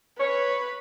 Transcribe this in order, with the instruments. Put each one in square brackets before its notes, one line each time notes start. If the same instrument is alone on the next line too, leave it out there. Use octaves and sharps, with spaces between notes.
[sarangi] B4 [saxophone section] C#5